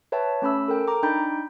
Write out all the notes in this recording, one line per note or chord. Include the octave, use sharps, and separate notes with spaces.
B4 C#5 E5 G5 A5
A3 C#4 B5 E6
A4 A#4 G5
A#5 D6
D4 D#4 G5 B5 G6